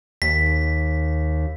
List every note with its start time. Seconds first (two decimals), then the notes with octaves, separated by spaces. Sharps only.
0.22 D#2 B6